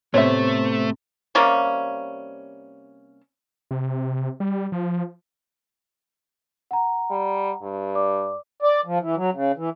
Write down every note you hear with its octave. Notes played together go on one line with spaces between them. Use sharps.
A2 C3 A3 B3 C5 C#5 E5
C3 G3 A#3 C#4
C3
G3
F3
F#5 A#5
G3
G2
D5 D6
D5
F3
E3
F#3
C#3
E3